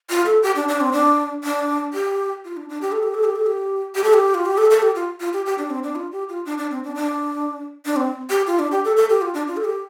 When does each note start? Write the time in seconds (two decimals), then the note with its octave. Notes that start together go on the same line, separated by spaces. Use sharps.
0.10 F4
0.26 A4
0.43 G4
0.56 D4
0.69 D4
0.81 C4
0.93 D4
1.44 D4
1.93 G4
2.45 F4
2.57 D4
2.69 D4
2.81 G4
2.92 A4
3.03 G4
3.14 A4
3.24 G4
3.35 A4
3.46 G4
3.95 G4
4.04 A4
4.14 G4
4.34 F4
4.46 G4
4.58 A4
4.71 A4
4.82 G4
4.96 F4
5.20 F4
5.33 G4
5.46 G4
5.58 D4
5.70 C4
5.84 D4
5.95 F4
6.12 G4
6.29 F4
6.46 D4
6.58 D4
6.71 C4
6.84 D4
6.96 D4
7.86 D4
7.96 C4
8.30 G4
8.47 F4
8.59 D4
8.72 G4
8.85 A4
8.97 A4
9.10 G4
9.22 F4
9.34 D4
9.48 F4
9.57 A4
9.64 G4